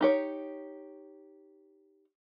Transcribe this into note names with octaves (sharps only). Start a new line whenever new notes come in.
D#4 G4 C#5